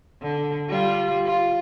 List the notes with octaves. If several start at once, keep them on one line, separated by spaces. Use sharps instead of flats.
D3
G3 F4
F4